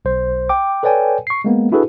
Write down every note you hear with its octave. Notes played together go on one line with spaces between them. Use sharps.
B1 C5
G5 D6
A4 B4 C#5 D5 G5 G#5
C#6 C7
G#3 A#3 B3
D4 E4 F#4 G#4 A4 B4